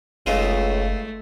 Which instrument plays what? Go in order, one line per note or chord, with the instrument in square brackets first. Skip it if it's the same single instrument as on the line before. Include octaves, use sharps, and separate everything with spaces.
[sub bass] F#1 [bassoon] C#2 [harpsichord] G#3 D#4 F4 [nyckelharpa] A3